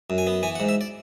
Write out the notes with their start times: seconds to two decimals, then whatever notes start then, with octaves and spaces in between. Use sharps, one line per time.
0.10 F#2
0.18 G#5
0.27 B3
0.43 E3 G#5
0.55 F#5
0.60 G#2
0.69 E5
0.81 D5